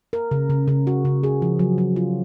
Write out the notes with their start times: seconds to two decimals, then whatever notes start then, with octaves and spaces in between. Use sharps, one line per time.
0.13 A#4
0.31 C#3
0.50 C#3
0.68 C#3
0.87 F#4
1.05 C#3
1.23 G#4
1.42 F3
1.59 F#3
1.78 F#3
1.96 F4